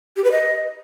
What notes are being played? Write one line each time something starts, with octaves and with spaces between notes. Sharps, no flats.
G4
B4
D#5